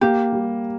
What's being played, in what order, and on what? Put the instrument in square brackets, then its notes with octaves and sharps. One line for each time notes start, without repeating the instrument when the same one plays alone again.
[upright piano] A#3 [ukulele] G4
[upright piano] G3